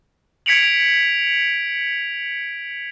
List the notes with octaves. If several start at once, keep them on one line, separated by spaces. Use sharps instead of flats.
G#6 B6 C#7 D7 F7 F#7